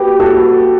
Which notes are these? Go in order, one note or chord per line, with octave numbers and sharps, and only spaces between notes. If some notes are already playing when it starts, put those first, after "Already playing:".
Already playing: F#4 G4 B4
F#4 A4